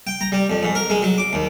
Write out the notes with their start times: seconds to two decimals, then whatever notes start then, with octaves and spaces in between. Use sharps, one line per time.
0.07 G5
0.21 A#5
0.32 G3
0.50 F2
0.63 G#2
0.75 A#4
0.90 G#3
1.02 F#3
1.18 D6
1.33 D#2